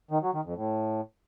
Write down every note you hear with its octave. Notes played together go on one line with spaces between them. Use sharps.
D#3
F#3
D#3
F2
A2